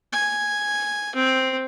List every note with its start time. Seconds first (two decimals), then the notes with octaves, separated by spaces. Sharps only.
0.12 G#5
1.15 C4